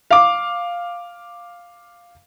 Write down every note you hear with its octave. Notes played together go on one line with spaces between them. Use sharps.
F5 D6